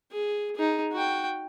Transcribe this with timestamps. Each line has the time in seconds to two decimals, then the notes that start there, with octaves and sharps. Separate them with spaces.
0.12 G#4
0.56 D#4 G#4
0.93 F#4 G5